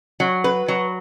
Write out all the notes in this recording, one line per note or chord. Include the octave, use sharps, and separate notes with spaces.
F#3
B4
F#3